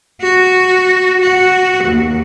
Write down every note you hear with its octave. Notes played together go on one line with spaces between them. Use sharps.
F#4
F#4 F#5
D#2